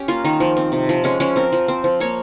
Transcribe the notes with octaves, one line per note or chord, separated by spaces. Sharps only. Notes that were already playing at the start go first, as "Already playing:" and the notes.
Already playing: C#4 G4
A#3 F4
D#3 D#4
F3
C4
C3
F3
G#3 C#4
F3 C#4
C4 A#4
F3
C4
F3
A#3 C#5